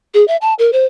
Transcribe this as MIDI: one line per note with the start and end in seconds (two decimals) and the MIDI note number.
0.14 0.26 68
0.28 0.37 76
0.41 0.54 81
0.59 0.71 70
0.73 0.86 72